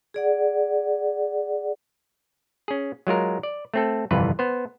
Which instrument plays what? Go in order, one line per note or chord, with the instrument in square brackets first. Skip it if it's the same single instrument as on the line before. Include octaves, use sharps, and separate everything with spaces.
[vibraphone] G#4 D5 F#5
[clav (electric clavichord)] C#4 G#4
F#3 G#3 F4 A#4
D5
A3 C4 A4
G1 C2 F2 E3 F4 B4
B3 C5